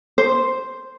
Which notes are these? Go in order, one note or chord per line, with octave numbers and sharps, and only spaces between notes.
C5